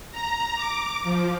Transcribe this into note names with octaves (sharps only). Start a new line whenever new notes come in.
A#5
D6
F3